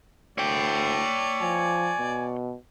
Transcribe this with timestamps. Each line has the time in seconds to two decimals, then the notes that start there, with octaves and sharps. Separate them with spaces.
0.38 D2 C#5 D5 G5
1.41 F3 G#5
1.99 B2